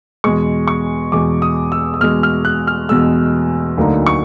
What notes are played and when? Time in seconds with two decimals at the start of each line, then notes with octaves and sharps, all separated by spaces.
0.24 E2 B2 G#3 C#6
0.68 C#6
1.12 E2 B2 G#3 D6
1.42 D#6
1.72 E6
1.94 E6
2.00 E2 B2 G#3 F6
2.23 F6
2.45 F#6
2.67 F6
2.89 E2 B2 G#3 E6
3.77 D2 D3 F#3 A#3 D#4
4.07 C#6